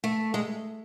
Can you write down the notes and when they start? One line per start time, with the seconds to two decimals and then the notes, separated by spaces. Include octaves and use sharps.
0.04 A3
0.34 G#3